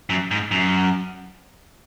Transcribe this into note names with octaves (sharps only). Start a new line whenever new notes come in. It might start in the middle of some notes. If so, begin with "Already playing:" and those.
F#2
G#2
F#2